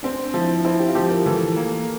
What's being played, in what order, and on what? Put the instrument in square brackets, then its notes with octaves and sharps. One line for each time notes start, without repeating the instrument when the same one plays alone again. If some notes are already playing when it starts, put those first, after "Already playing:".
[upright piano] C4 [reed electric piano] D4
[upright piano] F3 [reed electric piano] E4
[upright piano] C4 [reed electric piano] E4
[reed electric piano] G4
F4
[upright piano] F3 [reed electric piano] G4
[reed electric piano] A#4
[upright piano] E3 [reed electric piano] A4
[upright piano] A#3